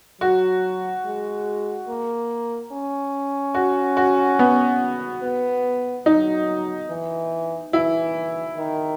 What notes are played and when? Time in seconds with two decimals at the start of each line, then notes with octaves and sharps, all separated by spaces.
0.21 F#3 F#4
1.04 G#3
1.88 A#3
2.72 C#4
3.54 F#4
3.97 F#4
4.39 B3
5.23 B3
6.06 F#3 D#4
6.90 E3
7.73 E3 E4
8.57 D#3